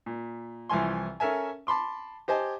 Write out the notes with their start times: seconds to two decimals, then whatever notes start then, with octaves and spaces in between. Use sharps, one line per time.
0.06 A#2
0.69 C2 E3 F3 G#5 C6
1.20 C#4 A4 A#4 E5 G#5
1.67 A5 B5 C6 D6
2.28 G4 C5 D#5 G#5 A5